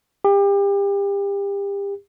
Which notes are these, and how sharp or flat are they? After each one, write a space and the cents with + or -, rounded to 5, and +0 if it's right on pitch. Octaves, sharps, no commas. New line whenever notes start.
G4 +30